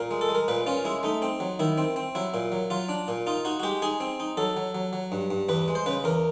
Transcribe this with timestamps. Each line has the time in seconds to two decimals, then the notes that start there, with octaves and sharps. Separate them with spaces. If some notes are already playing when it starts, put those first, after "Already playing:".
Already playing: A#2 A#4
0.11 G#3
0.21 A4
0.29 G#3
0.35 A#4
0.48 A#2 B4
0.67 C#4 F4
0.85 G#3 E4
1.03 A3 D#4
1.22 C4
1.40 F#3
1.60 D#3 E4
1.78 C4
1.96 C4
2.15 F#3 E4
2.34 A#2
2.52 F#3
2.70 F#3 F4
2.89 D4
3.08 A#2
3.27 D#4 F4
3.45 D#4 F#4
3.60 F#4
3.63 G#3 G4
3.82 D#4 G#4
4.00 C4
4.20 D#4
4.37 F#3 A4
4.57 F#3
4.75 F#3
4.93 F#3
5.12 G2
5.30 G2
5.49 E2 B4
5.68 G#3
5.75 C5
5.86 C#3 B4
6.04 E2 A#4